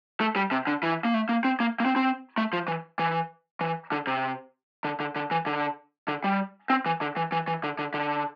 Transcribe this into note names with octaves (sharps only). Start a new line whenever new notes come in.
A3
G3
C3
D3
E3
A#3
A3
A#3
C4
A#3
A#3
C4
C4
A3
F3
E3
E3
E3
D3
C3
D3
D3
D3
E3
D3
D3
G3
C4
E3
D3
E3
E3
E3
D3
D3
D3